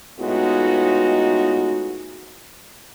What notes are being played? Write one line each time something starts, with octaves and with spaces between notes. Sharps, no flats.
A2 G#3 B3 D#4 F4 F#4